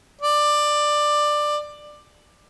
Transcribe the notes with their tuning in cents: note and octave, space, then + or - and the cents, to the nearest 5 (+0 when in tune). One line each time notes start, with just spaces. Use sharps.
D5 +15